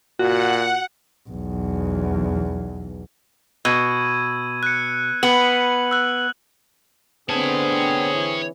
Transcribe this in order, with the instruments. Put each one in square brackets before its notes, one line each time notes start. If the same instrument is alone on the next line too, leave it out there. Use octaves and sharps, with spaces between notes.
[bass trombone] A#2 [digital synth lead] F#4 [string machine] F#5
[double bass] B1 E2
[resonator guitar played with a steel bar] B2 [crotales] E6 G#6 D#7
[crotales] F#6 C#7
[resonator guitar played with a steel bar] B3 [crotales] F#7
[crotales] E6 F#6
[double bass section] D3 C4 [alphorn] B3 [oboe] G#4 [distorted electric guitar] C#5 A5
[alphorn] E3